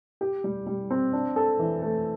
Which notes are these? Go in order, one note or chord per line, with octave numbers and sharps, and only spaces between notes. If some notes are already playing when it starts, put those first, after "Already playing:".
G4
G3
G3
C4
D4
A4
E3
A3